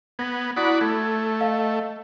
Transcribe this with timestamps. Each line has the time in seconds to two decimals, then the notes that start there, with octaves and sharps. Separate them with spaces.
0.19 B3 G#6 A#6
0.57 E4 F#4 D5 B5 D#6
0.81 A3 G#6
1.41 D#5 F5